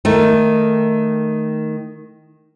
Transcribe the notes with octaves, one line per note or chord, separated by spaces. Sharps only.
D#3 A3